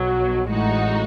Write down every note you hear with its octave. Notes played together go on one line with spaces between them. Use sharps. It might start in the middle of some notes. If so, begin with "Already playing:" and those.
Already playing: B1 B2 F#3
A1 A2 G#3 D#4 F#4